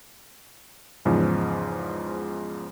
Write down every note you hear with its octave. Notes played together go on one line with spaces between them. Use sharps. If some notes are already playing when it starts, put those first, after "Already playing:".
E2 G#2 C#3 F3